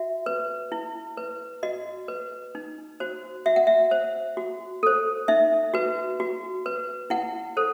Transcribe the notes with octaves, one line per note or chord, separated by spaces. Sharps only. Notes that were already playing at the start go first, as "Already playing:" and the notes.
Already playing: F#4 E5
B4
E4
B4
F#4 D#5
B4
D#4
F#4 C5
F#4 E5
F#5
E5
C5
F#4
A4 C5
D#4 E5
F#4 B4
F#4
B4
E4 F#5
A4 C5